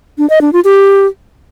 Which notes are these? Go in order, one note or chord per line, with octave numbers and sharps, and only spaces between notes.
D4
D#5
D4
F4
G4